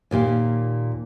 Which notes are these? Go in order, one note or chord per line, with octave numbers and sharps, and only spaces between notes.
D#2 A#2 G4 F5